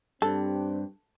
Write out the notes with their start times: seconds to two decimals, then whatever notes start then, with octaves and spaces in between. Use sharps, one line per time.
0.22 G2 C4 D4 G4 A4